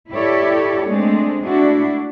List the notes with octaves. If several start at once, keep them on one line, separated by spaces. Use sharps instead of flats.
E4 G4 A4 C#5 D5
G#3 A3 C4 D4
A3 D4 E4 F#4